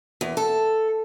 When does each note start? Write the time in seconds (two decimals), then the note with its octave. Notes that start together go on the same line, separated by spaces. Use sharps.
0.21 E2
0.37 A4